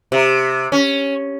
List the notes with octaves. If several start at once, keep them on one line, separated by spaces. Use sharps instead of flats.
C3
C#4